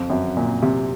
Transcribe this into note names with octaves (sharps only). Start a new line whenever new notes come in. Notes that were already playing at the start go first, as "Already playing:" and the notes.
Already playing: F2
F#2
A#2
C3